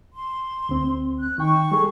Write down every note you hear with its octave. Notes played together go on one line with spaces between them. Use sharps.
C6
D2 C4
F#6
D#3 D#4 G5 C#6
G3 G#4 A4